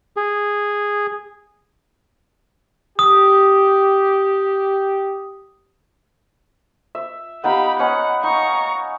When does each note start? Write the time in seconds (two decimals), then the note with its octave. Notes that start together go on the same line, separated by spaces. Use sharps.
0.17 G#4
2.99 G4 D#6
6.95 E5
7.44 B3 D#4 G4 F5 B5
7.79 B3 C#4 D#5 F#5
8.23 D#4 A#5 C#6